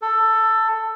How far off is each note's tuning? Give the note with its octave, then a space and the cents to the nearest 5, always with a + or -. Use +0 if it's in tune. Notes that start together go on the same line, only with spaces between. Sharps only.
A4 +10